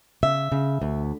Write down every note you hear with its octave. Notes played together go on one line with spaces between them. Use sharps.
C#3 E5
C#3
D2